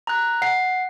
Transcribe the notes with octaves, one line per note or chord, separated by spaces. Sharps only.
A#5 F#6
F#5 C7